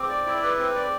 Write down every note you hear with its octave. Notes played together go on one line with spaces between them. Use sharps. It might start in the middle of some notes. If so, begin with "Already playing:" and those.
Already playing: C4 D6
D5
E4
B4
C4
D5